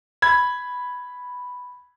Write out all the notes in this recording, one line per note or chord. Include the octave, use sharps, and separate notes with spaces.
B5 G#6